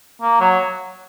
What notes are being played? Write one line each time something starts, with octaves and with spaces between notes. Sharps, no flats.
A#3
F#3